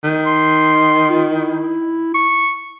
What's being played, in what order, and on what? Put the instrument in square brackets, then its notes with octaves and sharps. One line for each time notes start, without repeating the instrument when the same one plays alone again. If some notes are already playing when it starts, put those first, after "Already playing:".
[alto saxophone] D#3
[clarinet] C6
F4
E4
C#6